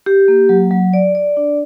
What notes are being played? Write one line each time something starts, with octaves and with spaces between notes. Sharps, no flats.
G4
A#3
F#3
F#3
D5
D5
D4